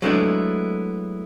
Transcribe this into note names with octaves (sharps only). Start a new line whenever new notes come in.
F#3 G#3 A3 B3 D4 E4